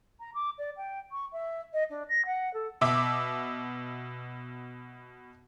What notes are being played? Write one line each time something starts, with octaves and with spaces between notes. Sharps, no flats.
A#5
D6
D5
G5
C#6
E5
D#5
D4
A#6
F#5
A4
B2 E5 D6